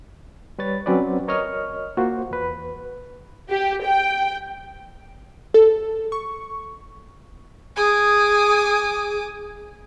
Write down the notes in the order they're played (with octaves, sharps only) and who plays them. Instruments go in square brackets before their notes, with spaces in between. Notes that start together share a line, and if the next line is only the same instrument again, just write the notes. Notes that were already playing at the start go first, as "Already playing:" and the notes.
[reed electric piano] G3 B4 C#5 A6
F#3 C4 C#4 B4 D5
A#4 C#5 D#5 C#6 F6
A#3 F4 F#4 C5
E2 B4
[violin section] G4
G5
[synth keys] A4
C#6
[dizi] G#4 [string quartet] G#5 D6 D#6